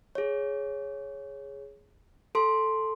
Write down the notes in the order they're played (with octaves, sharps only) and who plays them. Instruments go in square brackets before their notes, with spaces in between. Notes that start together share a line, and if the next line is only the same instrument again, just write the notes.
[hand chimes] G#4 C#5
A4 C6